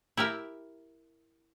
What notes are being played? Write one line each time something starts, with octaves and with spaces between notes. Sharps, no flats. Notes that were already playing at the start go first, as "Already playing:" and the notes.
E4 G4 A#4 E5